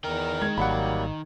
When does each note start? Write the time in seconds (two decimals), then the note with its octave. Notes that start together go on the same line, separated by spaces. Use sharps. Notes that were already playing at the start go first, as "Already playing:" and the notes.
0.04 E2 D#3 A#4 D#5 G5
0.42 G#3 G#6
0.58 G#1 F#3 G3 A#3 F#5 B5